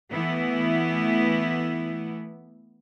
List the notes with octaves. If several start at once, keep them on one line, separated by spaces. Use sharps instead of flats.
E3 A3 B3 E4